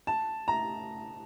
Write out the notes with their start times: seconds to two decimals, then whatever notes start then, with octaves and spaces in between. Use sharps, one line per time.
0.07 A5
0.48 A#5